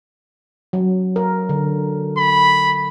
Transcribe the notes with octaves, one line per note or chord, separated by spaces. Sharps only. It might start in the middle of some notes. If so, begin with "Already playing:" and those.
F#3
A#4
D3
B5